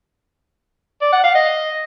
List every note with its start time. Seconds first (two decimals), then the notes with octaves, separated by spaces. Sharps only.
1.01 D5
1.13 F#5
1.24 F5
1.35 D#5